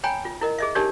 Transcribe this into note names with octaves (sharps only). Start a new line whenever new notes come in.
C#5 G5 G#5 A#5 B5
F4
E4 A#4 D#5
G#4 D#5 E5
D4 D#4 G4 A#4 C#5 D5